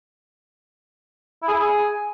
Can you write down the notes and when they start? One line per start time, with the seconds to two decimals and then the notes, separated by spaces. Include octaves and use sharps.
1.42 E4
1.48 G#4
1.53 E4
1.59 G#4